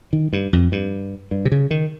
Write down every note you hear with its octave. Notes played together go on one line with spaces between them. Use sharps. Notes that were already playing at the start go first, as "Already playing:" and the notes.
D#3
G2
F2
G2
G2
C3
C#3
D#3